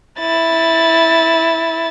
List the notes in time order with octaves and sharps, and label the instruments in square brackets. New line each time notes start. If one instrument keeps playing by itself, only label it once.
[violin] E4 A6